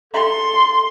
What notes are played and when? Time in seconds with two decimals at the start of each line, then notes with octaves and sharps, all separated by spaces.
0.14 A4 C6